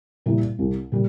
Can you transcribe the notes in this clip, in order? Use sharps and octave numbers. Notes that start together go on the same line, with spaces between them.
A#2 G3 A#3 E4
C2
A#2 G3